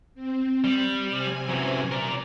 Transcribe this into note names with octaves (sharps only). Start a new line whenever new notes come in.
C4
G3
C3 C4 G#5
F#2 E3
A#4 D5